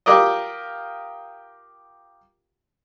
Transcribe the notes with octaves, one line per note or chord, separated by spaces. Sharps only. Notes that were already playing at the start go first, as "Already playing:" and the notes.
F4 G4 A#4 D5 D#5